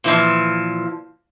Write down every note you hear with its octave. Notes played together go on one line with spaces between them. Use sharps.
A#2 E3 F3